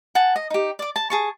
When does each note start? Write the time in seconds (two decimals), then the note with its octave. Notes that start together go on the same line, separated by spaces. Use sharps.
0.15 F#5 G#5 A5
0.36 D#5
0.50 D#4 G4
0.79 D5 D6
0.96 A5
1.10 G#4 A5 C#6